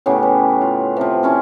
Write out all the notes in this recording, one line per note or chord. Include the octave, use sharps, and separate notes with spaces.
A2 C#3 B3 G4
B4
F4
C3 F3
C4 C#4 E4 A5